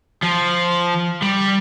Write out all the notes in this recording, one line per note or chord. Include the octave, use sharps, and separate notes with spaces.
F3
G3